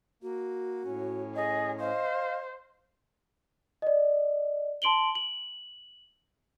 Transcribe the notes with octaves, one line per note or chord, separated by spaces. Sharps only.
A#3 F#4
A2 C#4
G#4 D#5
C5 D#5 F5
D5 D#5
A5 C6 D7 F#7 G7
F#7